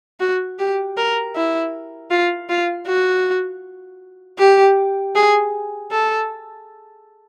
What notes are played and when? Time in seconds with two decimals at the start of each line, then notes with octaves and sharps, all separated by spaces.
0.20 F#4
0.59 G4
0.97 A#4
1.35 E4
2.10 F4
2.49 F4
2.87 F#4
4.39 G4
5.15 G#4
5.91 A4